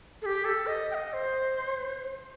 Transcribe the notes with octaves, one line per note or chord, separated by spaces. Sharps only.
A4
G4
A4
D#5
G5
D#5
C5